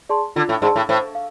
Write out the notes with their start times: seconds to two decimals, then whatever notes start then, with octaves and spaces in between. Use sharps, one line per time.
0.09 G#4 D5 A5 C6
0.36 D3 F4
0.49 A2
0.62 G#2 G#4 D5 A5 C6
0.76 A2
0.89 A2 C5
1.15 F5